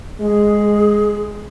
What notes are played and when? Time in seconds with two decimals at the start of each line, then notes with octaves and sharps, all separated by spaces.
0.20 G#3 G#4